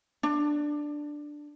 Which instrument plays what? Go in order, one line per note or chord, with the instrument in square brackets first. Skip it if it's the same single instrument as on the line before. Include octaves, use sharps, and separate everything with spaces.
[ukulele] D4